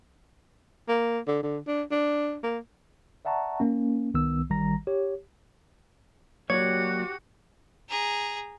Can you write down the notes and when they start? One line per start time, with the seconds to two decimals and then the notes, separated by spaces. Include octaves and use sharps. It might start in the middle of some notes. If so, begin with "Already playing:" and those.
0.88 A#3
1.27 D3
1.43 D3
1.67 D4
1.91 D4
2.43 A#3
3.25 D5 E5 F#5 A5 A#5 C#6
3.60 A#3 C#4
4.14 C2 D#3 B3 E6
4.50 A1 D#3 G3 A#5 A#6
4.87 G4 C#5
6.50 F#3 A#3 F#4 G4 C#5 D5 C#7
7.89 G#4 A#5